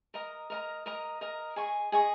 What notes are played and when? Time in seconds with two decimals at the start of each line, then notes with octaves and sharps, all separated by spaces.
0.14 A#4 D#5 A#5
0.50 A#4 D#5 A#5
0.86 A#4 D#5 A#5
1.21 A#4 D#5 A#5
1.56 G#4 D#5 G#5 C#6
1.92 G#4 D#5 G#5 C#6